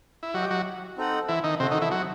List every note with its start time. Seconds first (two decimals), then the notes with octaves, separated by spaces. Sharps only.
0.23 E4
0.34 F#3 F#4 G4 D#5 G5
0.51 F#3 F#4
0.97 C4 D#4 A4 D#5 F#5
1.28 E3 E4
1.44 D#3 D#4
1.60 C3 C4 F#4 A4 D#5
1.71 D#3 D#4
1.81 E3 E4
1.91 F#3 F#4